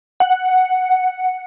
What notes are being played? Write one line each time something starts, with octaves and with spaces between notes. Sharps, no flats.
F#5